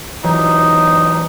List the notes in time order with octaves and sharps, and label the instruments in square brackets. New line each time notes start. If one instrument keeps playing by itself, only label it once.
[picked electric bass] E3 F#3 [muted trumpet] D#4